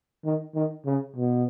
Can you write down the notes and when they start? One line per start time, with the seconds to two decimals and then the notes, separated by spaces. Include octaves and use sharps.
0.25 D#3
0.55 D#3
0.85 C#3
1.16 B2